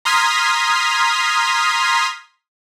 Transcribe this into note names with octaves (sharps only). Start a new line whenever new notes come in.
A#5 C6 D#6 F6 G#6 B6